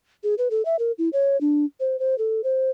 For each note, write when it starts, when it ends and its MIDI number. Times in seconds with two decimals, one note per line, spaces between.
0.24 0.35 68
0.38 0.48 71
0.51 0.65 69
0.65 0.76 76
0.79 0.92 70
0.98 1.09 64
1.13 1.39 73
1.41 1.65 62
1.80 1.99 72
1.99 2.17 72
2.18 2.41 69
2.44 2.71 72